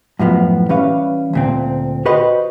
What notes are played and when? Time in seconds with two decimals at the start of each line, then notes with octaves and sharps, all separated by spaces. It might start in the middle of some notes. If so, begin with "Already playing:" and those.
0.19 F#2 A2 F3 B3
0.69 E3 G3 C#4 B4 F5
1.33 D2 A#2 C4
2.06 F#4 G4 B4 C5 D#5